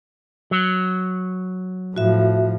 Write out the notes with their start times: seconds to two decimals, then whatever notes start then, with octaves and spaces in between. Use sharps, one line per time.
0.51 F#3
1.96 A2 F3 F#4 E5